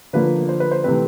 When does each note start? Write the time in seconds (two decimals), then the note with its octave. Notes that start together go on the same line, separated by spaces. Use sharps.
0.13 D3 F3 A#3 B4
0.49 C5
0.60 B4
0.71 C5
0.84 C3 E3 A3 C4 B4